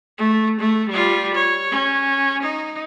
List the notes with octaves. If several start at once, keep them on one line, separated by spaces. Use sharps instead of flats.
A3
A3
G3 F4
C#5
C#4
D#4